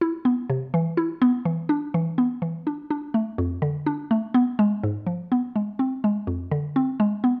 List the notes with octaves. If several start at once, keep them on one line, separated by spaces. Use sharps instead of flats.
E4
B3
C3
E3
E4
B3
E3
D4
E3
B3
E3
D4
D4
A3
F2
D3
D4
A3
B3
G#3
G#2
F3
B3
G#3
C4
G#3
F2
D3
C4
G#3
B3